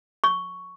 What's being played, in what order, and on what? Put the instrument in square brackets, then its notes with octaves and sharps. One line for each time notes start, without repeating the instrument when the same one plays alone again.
[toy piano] C#6